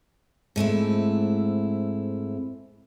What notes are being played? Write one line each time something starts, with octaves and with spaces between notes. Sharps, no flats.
G#2 A3 C4 E4